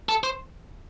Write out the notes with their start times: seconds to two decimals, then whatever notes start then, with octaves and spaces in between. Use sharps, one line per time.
0.09 A4
0.23 C5